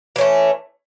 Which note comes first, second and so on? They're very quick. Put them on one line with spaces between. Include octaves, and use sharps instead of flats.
E3 C#4 A3